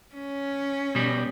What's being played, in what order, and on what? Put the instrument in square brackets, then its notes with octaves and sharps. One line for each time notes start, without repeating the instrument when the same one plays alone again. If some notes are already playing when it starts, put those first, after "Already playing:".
[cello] C#4
[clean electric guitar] B2 G3